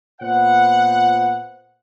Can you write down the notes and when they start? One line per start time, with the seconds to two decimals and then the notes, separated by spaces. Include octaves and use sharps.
0.21 A#2 B3 F4 C5 F#5